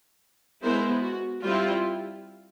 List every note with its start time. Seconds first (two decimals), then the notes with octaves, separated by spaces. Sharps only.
0.63 G#3 B3 E4 A#4 C5
1.03 F#4
1.43 G3 C4 E4 F4